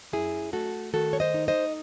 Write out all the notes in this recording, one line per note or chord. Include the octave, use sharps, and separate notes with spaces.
F#2 E4 G#4
A3 F#4 A4
D#3 F#4 A4
C#5
C5 D#5
D#4
C5 D#5